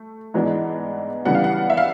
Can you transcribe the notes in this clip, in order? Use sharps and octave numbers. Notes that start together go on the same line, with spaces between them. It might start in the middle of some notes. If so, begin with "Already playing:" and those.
Already playing: A3
G#2 E3 G#3 B3 D4
C#3 E3 G3 B3 D4 F#5
F5
F#5
E5
F5